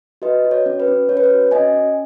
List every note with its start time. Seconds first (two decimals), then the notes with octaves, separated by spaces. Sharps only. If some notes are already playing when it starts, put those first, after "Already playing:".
0.22 F#4 B4 D#5
0.44 F#4
0.51 C#5
0.66 C#4
0.80 B4
0.88 C#4
1.09 C#4 C#5
1.17 B4
1.24 C#5
1.31 F#4
1.51 C#4 D#5 G#5
1.73 C#4